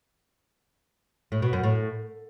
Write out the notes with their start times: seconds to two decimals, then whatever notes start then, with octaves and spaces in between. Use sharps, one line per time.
1.32 A2
1.42 B2
1.53 F#2
1.63 A2